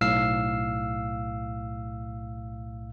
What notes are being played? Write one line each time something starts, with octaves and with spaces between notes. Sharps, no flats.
B1 A2 F5 E6 C7